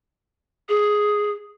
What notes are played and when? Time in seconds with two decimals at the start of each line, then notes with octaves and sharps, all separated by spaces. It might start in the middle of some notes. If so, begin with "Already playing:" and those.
0.69 G#4